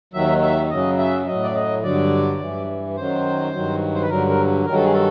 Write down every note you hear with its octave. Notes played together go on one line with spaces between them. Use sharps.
D#2 D#3 F#3 E5
E5
F#2 C#3 F#3 D#5
E5
A2 F#3 D#5
D5
D#5
G2 D3 F#3 D5
G2 E3
F#2 D#3 F#3 C5
G2 D#3 F#3
C5
B4
G2 D3 F#3 A#4
A#4
G2 D#3 F#3 A#4
A4
G#4
A4